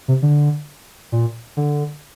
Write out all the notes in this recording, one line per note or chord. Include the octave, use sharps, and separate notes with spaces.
C3
D3
A#2
D3